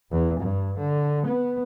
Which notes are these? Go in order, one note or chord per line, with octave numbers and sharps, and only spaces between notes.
E2
G2
D3
B3